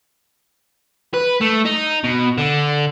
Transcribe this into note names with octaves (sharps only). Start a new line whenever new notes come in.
B4
A3
D#4
B2
D3